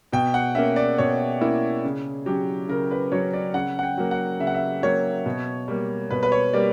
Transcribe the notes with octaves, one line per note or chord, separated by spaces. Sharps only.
B2 G5
F#5
A#3 C#4 E5
D5
B2 C#5
A#3 C#4 E4
C#3
F#3 C#4 G4
C#3 A#4
B4
F#3 C#4 C#5
D5
C#3 F#5
F#5
G5
F#3 A#3
F#5
C#3 E5
F#5
E5
F#3 A#3 C#5
B2
G3 A#3
B2 B4
B4
C#5
G3 A#3 D5